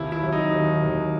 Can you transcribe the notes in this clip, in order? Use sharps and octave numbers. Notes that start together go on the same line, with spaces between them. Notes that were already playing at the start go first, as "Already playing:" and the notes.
Already playing: D#2 C3 E4
E4
F#3
D#4
D#2
D#2